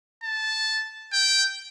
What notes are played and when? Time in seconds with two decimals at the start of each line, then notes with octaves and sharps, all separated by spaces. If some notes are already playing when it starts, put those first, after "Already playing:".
0.23 A5
1.13 G5